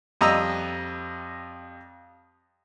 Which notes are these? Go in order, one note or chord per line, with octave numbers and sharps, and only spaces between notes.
F2 G3 D#5 A#5 E6